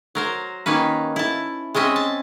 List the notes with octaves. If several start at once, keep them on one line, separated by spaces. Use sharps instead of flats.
F#3 A#4 C5
D#3 A#3 C#4 B4
E4 A5
G#3 C4 C#4 D#5 E5
A5